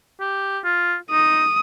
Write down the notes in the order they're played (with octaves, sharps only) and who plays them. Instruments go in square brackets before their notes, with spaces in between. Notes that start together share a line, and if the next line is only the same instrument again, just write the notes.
[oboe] G4
F4
[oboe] D#4 [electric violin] D#6